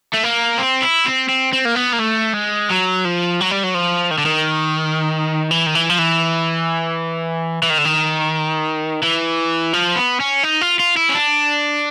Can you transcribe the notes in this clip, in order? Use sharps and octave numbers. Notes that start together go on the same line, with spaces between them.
A3
A#3
C4
E4
C4
C4
C4
A#3
B3
A#3
A3
G#3
F#3
F3
F#3
G3
F#3
F3
D#3
D3
D#3
E3
D#3
E3
F3
E3
E3
D#3
D3
D#3
E3
F3
B3
C#4
D#4
F4
F4
E4
C#4
D4